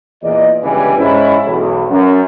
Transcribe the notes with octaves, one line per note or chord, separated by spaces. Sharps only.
E2 A#2 D5 D#5
G1 C#2 E3 G3 B4 G#5
G#2 C#4 D#4 E4
B1 E2
F#2